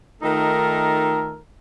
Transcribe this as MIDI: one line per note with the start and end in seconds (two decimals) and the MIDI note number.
0.22 1.37 51
0.22 1.37 57
0.22 1.37 63
0.22 1.37 65
0.22 1.37 69
0.22 1.37 70